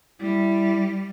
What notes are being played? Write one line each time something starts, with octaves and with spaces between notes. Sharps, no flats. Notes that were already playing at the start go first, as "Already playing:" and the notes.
G3 E4